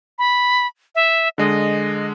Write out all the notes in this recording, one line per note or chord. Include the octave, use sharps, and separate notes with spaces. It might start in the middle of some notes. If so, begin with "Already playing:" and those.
B5
E5
D3 G#3 D#5